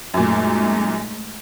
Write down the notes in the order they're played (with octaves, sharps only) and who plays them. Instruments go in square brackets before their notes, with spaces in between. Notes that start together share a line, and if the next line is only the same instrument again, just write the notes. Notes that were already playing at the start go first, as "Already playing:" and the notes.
[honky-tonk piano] F#2 A#2 [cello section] G#3 A3 D#4